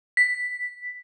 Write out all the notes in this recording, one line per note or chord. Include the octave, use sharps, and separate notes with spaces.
B6